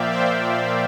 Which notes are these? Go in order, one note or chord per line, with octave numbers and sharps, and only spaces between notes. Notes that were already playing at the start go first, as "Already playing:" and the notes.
Already playing: A#2 F3 A#3 D5 E5 F5 G5
C5 E5